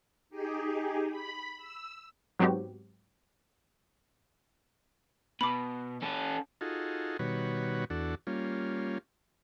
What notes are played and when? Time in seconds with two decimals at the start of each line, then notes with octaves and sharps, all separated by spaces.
0.30 D#4 G4 G#4
1.10 B5
1.57 E6
2.39 G#2 F#3 B3 C4 F#4 G4
5.41 B2 B5 D6
6.02 C#4 A4
6.61 D#4 F4 F#4 G#4 A4
7.19 B2 D#3 G3 F#4 B4 C#5
7.90 E2 D4 F#4 A4
8.27 G3 A#3 C#4 F4